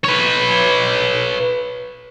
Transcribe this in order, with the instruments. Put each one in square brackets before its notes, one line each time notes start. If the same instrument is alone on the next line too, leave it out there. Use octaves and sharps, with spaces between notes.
[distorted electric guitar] B4 C#5